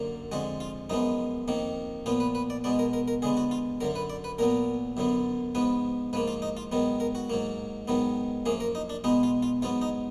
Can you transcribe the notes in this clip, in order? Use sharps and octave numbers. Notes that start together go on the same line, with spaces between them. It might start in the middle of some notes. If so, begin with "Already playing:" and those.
Already playing: F#2 D3 F#3 A#3
F2 D3 G#3 F#4
F4
F#2 F3 G#3 B3 D#4
F2 D#3 A#3
A#2 F3 B3 F4
B4
B4
D5
B2 G#3 B3 D5
A#4
A#4
A#4
D3 G#3 B3 G#4
F#4
F4
F#2 D3 F#3 A#4
B4
D5
B4
A#2 F#3 B3 A#4
F#2 D3 F#3 B3
G#2 F3 B3 B4
G#2 F3 A#3 B4
F4
D#4
F4
G#2 D#3 F#3 B3
A#4
F#4
G#2 F#3 A#3
G#2 D#3 F#3 B3
F#2 F3 A#3 G#4
A#4
D#4
D4
B2 G#3 B3 D#4
F4
F4
G#2 F#3 B3 F4
D#4